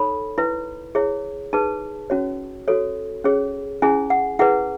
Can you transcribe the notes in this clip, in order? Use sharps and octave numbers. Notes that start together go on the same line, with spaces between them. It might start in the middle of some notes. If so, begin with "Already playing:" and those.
Already playing: D#4 A4 C#5 B5
E4 B4
E4 G#4 C#5
D#4 G#4 B4 A5
C#4 F#4 C#5
F#4 A4 C#5
C#4 G#4 C#5
C#4 E4 G#4 G#5
F#5
E4 G#4 B4 F#5